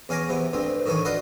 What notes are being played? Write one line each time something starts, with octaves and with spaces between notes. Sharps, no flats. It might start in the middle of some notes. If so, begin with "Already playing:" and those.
E2 C#4 F5 G#5 A#5 D6
E2 C3 B3
D2 G2 C4
A2 D#3 E3 A4 C#5
F4 F#4 B4 D5 D#5 F5